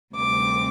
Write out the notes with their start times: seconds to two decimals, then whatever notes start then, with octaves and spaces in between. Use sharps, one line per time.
0.15 D2 C3 G3 C4 D6